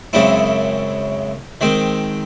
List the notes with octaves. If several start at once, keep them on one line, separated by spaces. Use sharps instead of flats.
F#2 C#3 G#3 C4 E4
D#3 G#3 C4